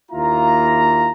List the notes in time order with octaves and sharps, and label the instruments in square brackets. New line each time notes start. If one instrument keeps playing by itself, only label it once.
[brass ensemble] D#2 A#3 E4 F4 A#5